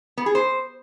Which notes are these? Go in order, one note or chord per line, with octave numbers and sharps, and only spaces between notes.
B3
G#4
C5